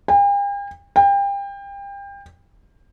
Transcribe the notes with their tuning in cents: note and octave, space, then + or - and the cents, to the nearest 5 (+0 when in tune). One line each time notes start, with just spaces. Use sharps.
G5 +45
G5 +30